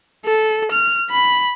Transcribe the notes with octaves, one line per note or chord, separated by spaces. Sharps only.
A4
F6
B5